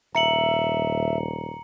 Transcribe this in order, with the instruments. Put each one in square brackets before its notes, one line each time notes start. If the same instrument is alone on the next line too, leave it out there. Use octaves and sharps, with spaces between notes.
[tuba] D#1 [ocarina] E5 [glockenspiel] A#5 C#7 F#7